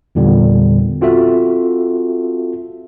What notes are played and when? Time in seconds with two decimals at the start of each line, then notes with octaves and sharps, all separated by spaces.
0.15 E2 A#2 D3 G3 B3
1.01 C4 F4 F#4 A4 E5